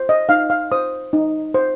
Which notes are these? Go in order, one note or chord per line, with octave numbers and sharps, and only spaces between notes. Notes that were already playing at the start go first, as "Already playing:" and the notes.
Already playing: C5
D#5
D#4 F5
F5
C5 D#6
D#4
C5